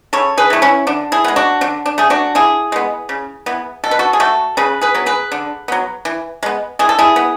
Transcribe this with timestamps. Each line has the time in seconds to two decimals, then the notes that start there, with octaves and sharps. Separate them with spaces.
0.13 C#3 A4 C#5
0.37 G#4 B4
0.50 E3 A3
0.62 C#4 E4
0.87 D3 D4
1.12 E4 G#4
1.24 G#3 B3
1.36 D4 F#4
1.61 D3 D4
1.86 D4
1.98 A3 G#4
2.10 D4 F#4
2.35 D3 E4 G#4
2.72 G#3 B3
3.09 C#3
3.46 E3 B3
3.84 B2 A4
3.91 B4
3.99 F#4 A4
4.13 G#4
4.20 A3 F#4 A4
4.57 C#3 G#4 B4
4.81 G#4 B4
4.94 F#3 B3
5.06 G#4 B4
5.32 D3
5.68 F#3 B3
6.05 E3
6.43 G#3 B3
6.79 E3 G#4
6.89 A4
6.99 E4 G#4
7.16 B3